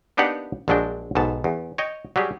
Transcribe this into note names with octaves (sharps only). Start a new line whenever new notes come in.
A#3 B3 D4 D#4 G4 F#5
A#1 F3 F#3 G#3 D4 G5
B1 G#2 B3 A5
E2
C#5 D#5 G5
F#3 G3 G4 G#4